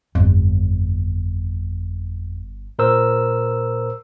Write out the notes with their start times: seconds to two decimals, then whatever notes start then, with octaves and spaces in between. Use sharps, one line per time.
0.15 G1 F2
2.79 A#2 A#4 C5 E6